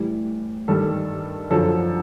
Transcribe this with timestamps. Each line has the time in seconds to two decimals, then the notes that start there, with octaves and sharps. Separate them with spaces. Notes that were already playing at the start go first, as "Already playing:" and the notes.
Already playing: A2 E3 G3
0.68 G2 D#3 G3 A4
1.50 F#2 D3 F3 A4